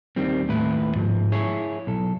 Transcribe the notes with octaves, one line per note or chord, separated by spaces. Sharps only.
D#2 D#3 G3 C4
D#2 A2 E4 B4
G#2 F3
E4 G#4 C#5
B1 A4